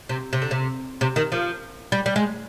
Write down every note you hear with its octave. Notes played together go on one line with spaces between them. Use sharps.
C3
C3
D3
C3
C3
D#3
F3
G3
G3
G#3